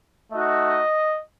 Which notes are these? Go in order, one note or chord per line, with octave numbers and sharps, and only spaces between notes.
A3 D#4 F#4 D#5